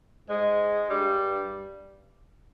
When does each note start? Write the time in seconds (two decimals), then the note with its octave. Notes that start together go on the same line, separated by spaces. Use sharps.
0.28 G#2 G#3
0.89 G2 G3